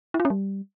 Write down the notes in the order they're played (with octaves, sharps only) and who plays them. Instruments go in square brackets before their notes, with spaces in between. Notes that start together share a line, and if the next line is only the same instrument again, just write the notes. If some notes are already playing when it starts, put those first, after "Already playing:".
[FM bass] E4
F4
C#4
G3